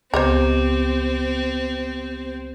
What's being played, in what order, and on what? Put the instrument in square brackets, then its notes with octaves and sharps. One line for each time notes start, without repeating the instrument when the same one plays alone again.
[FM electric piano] C#2 [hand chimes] B3 G4 D6 [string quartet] C4 [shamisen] C5 D#5 A#5